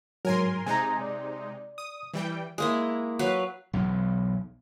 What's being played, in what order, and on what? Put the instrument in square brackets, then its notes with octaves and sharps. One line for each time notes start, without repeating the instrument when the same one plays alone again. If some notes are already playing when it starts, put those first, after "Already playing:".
[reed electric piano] G#2 F#3 [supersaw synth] A#4 G#5 C6
[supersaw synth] C3 G#3 D#4 [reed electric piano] G#5 A#5
[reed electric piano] D5
[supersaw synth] D#6
E3 G3 G5
[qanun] G#3 A#3 E4
F#3 B4 F5
[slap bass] B1 E2